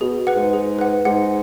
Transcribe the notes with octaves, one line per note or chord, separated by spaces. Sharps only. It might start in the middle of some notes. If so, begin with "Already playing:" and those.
B2 G#4
B4 F#5
G#2
G#4
B4 F#5
G#2 F#5